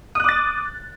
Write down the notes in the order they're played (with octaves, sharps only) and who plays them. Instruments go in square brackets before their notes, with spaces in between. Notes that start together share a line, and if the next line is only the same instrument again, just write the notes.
[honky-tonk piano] D#6
F#6
D6
A6